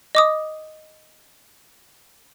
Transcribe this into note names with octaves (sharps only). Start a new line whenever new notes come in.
D#5 D6 D#6